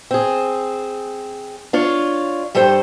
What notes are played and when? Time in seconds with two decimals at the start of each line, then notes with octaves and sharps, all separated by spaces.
0.11 C4 G#4
1.73 D4 F4 C#5
2.55 G2 G3 A4 C5 G5